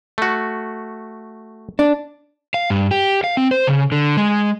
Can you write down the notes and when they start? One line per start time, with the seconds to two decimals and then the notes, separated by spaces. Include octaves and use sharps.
0.18 A3 F#4
1.79 D4
2.54 F5
2.70 G2
2.91 G4
3.24 F5
3.37 C4
3.51 C5
3.67 C#3
3.92 D3
4.17 G#3